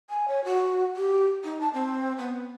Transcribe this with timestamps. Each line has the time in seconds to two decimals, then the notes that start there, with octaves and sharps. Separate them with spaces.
0.10 G#5
0.28 C#5
0.45 F#4
0.96 G4
1.44 D#4
1.61 A5
1.74 C4
2.18 B3